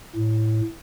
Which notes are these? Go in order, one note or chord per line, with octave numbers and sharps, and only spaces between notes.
A2